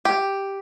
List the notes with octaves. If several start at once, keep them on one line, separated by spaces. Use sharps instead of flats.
G4